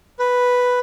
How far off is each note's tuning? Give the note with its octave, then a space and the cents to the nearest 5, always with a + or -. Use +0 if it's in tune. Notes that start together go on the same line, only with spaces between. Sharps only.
B4 +0